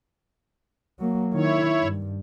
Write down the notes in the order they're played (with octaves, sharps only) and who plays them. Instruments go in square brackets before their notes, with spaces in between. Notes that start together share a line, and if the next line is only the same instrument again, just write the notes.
[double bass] F#3 A#3
[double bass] D#3 [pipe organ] E4 C#5
[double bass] G2